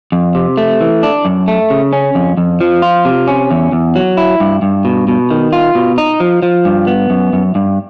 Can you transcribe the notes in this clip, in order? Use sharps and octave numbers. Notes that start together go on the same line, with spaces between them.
F2
C3
A3
E3
D4
F#2
A3
C#3
C#4
F2
F2
F3
F4
C3
C#4
E2
E2
F#3
E4
G2
G2
B2
B2
D#3
F4
B2
D#4
F3
F3
G2
B3
F#2
F#2
G2